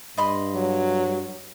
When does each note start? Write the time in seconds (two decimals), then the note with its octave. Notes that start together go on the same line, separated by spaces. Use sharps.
0.17 G2 D#5 B5 C6
0.55 F#3